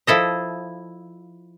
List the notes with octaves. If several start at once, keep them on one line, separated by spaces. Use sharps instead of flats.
F3 E4 A4 D#5